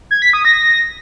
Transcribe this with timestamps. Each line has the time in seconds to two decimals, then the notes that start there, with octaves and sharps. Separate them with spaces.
0.11 G#6
0.22 B6
0.33 D#6
0.45 A#6